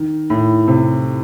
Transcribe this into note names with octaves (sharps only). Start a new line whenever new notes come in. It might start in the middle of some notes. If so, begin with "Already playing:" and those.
Already playing: D#3
A2
C3